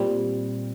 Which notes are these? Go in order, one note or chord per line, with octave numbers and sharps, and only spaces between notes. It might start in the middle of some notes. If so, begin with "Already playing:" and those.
Already playing: A#2 G3 C4